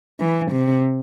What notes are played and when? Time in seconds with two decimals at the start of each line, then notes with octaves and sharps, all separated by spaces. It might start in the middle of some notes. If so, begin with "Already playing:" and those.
0.20 E3
0.51 C3